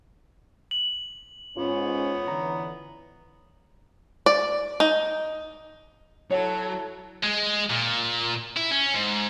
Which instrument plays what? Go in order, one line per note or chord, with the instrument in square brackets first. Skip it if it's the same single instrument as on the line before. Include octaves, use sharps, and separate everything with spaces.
[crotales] F#7
[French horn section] G#2 C#4 [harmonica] B3 C#5 [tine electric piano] F4
[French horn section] D3 E3 [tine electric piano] A#5
[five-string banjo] D5
D#4
[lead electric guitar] F#3 [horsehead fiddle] E4 A4 [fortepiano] C#5
[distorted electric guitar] G#3
A#2
E4
C#4
G#2